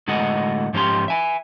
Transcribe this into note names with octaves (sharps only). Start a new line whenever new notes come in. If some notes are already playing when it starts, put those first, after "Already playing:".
A2 D3 G#3 F#4 D#5 F#5
G#2 F3 C#4 G4 C6
E5 G#5